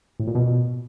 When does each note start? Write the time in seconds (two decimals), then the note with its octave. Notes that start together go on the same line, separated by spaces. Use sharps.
0.20 A2
0.27 A#2
0.35 B2